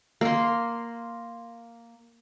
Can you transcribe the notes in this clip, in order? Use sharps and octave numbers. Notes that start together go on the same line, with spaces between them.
A#3 C6